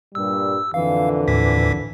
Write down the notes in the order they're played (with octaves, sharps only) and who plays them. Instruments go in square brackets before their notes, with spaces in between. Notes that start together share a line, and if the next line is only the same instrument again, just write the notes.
[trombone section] G2 A#2 G3 [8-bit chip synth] E6
[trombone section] F2 A#2 D3 [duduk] E3 [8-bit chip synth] F5
[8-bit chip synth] D#2 A2 B6